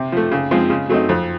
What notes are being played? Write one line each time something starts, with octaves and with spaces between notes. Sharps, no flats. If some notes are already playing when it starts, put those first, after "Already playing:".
Already playing: C3
F3 A3
C#3
F3 G#3 C4
C#3
F#3 A3 C4 D#4
F2